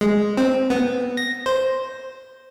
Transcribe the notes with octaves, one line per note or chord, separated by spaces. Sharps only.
G#3
C4
B3
A#6
C5